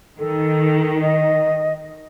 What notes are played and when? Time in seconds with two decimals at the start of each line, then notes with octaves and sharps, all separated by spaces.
0.19 D#3 A4
1.02 D#5